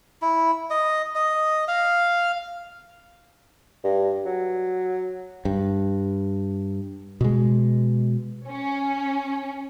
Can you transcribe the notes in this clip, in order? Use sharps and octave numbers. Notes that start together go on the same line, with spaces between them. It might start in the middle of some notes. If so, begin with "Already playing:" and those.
E4
D#5
D#5
F5
G2
F#3
G2
B2 G#3
C#4